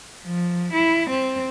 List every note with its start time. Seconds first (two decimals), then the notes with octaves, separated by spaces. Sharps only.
0.24 F3
0.74 E4
1.10 C4